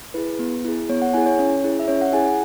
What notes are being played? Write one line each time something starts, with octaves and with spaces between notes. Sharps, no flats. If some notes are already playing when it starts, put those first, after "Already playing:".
E4 G#4 B4
B3
E4 G#4
B3 C#5
F#5
E4 G#4 G#5
C#5
C#4
E4 G#4
E5
C#4 C#5
F#5
E4 G#4 G#5
F#5